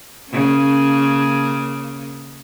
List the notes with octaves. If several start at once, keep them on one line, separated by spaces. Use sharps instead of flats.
C#3 A#3 C#4